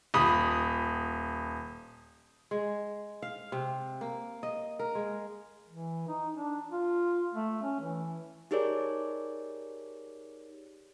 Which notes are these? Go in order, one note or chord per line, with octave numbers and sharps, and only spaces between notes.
D#1 B5 D#6
G#3
F5
C3
A#3
D#5
A#4
G#3
E3
D#4
D4
F4
A3
C#4
E3
D#4 G4 G#4 A#4 C#5 D5